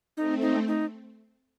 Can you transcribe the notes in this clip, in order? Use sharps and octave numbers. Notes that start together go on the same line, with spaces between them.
A3 C4 D#4
D#4
D#4